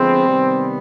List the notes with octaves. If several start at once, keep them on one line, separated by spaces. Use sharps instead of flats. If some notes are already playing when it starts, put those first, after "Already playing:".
Already playing: D3 F3 G#3 B3 C4
C3 D#3 G3 B3